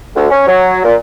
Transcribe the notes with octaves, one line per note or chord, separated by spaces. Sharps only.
D2
C#4
F#3
A#2